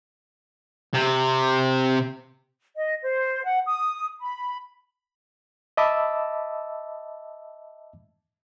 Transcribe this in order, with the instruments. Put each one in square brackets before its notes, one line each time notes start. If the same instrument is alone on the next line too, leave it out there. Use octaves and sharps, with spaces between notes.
[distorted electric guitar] C3
[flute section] D#5
C5
F#5
D#6
B5
[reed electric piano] D#5 E5 A5 B5 D6 E6